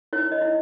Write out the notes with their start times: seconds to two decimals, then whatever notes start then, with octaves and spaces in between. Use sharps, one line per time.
0.13 E4 C#5
0.32 D#5
0.41 E4